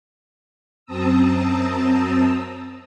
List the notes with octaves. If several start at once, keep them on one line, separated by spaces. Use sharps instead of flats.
F#2 C4 A5 A#5 D#6 E6